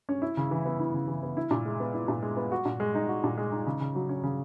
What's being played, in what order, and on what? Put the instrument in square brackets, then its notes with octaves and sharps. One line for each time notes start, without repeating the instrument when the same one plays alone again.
[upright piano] C#4
E4
C#3
E3
B3
E4
C#3
E3
B3
E4
A#2
G#3
B3
E4
A#2
G#3
B3
F#4
A#2
G#3
D#4
F#4
A#2
G#3
D#4
C#3
C#3
F#3
C#4
C#3